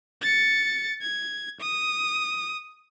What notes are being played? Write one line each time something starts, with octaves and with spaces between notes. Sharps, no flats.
A6 C#7
G#6
D#6